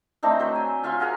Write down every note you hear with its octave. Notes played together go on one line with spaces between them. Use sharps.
A3 C4 D4 D#4
F#3 C5 E5
G#5
C#4 F4 E5 C6
F#4 G#4 F5 A#5